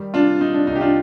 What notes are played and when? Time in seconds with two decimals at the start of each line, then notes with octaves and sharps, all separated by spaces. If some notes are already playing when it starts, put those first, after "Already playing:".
Already playing: D#3 G3
0.14 C3 D4 F4
0.40 C3 D#4
0.54 D4
0.67 C2 D#4
0.76 G4
0.81 D4 F4